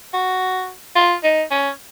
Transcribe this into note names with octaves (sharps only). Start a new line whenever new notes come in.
F#4
F4
D#4
C#4